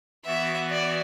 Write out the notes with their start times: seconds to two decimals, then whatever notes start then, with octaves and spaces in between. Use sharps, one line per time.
0.25 E3 B3 F#4 E5
0.70 D5